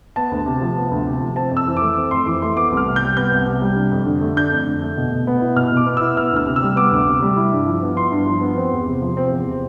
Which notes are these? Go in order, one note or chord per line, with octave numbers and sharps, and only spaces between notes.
B3 A5
D2
C3
F3
B3
D2
C3
F3
C4 A5
F2
E6
E3
A3 D6
C4
F2 C6
E3 D6
A3 C6
B3 D6
C2
F6
C3
G6
G3
B3 G6
C2
C3
G3
D4
F2
D3
A3
D4 G6
F2
D3
A3
B2
B2
B3
E4
B2 F6
B2
D6
B3
E4 E6
B3 F6
D2 F6
C3
E6
G3
B3 D6
D2
C3
G3
E4
G2
F3
B3
E4 C6
G2
F3
B3
C4
E2
C3
F3
C4
E2
C3